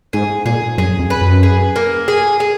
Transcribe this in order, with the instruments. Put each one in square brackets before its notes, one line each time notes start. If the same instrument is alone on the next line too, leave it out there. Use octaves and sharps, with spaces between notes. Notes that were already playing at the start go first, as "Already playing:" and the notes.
[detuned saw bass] G#2 [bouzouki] G#4
[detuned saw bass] A#2 [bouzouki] G#4
[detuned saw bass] F#2 [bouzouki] G#4
[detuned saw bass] F2
[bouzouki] B4
[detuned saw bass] F#2
[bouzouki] G#4
A#3
G#4
G#4